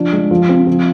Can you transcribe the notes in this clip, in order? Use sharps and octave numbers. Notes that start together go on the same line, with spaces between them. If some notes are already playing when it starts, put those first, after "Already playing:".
Already playing: F3 D4
G#3
F3
C4
F3